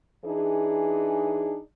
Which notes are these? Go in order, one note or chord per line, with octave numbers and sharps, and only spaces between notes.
E3 D4 D#4 G#4